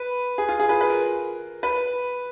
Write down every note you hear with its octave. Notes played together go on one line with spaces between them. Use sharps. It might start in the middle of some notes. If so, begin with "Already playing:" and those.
Already playing: B4
G#4
F4
G#4
B4
B4
A#4
B4